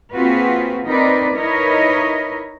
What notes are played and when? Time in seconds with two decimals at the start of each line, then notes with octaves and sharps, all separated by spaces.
0.13 A#3 C4 F4 F#4 G#4 B4
0.85 C4 D#4 A#4 B4 D5
1.34 D#4 E4 A#4 B4 C#5 D#5